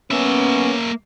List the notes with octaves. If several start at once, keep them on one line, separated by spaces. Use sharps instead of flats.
A#3 B3 C#4 E5